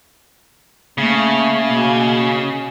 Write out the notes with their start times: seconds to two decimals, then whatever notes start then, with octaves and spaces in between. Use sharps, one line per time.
0.98 C#3 A3 A#3
1.67 B2 A#3